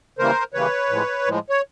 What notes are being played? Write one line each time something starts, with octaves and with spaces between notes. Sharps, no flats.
C#3 E3 G3 A#3 A#4 C5
C#3 E3 G3 A#3 B4 C#5
A2 F3 G#3
A2 F3 G#3
C#5